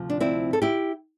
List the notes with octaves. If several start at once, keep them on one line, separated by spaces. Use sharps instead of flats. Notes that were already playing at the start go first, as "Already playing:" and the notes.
Already playing: D2 C3 F3
D4
C4 E4
A4
E4 G4